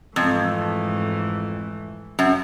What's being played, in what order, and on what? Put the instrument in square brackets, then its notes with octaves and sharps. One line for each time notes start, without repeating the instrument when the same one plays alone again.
[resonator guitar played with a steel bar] F2 [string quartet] G#2 E3 A3
[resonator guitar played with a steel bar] F#2